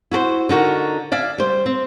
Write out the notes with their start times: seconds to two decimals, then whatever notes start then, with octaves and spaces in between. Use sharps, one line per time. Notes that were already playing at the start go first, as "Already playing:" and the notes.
0.11 E4 F#4 A4 C5
0.49 D3 D#4 F#4 A#4
1.12 D5 E5 F5 G#5
1.38 G3 C5
1.66 C4